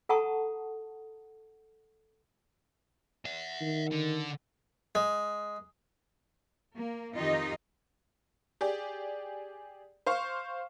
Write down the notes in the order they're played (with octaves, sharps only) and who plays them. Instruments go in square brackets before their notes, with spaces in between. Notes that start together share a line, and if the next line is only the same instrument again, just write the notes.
[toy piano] A4 F#5 A5 A#5 C#6 D#6
[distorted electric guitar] E5 F#5
[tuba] D#3
[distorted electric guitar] D3
[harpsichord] G#3
[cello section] A#3
F2 D#3 D#4 F4 G4 D#5
[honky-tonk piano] G4 G#4 D5
C5 F5 C#6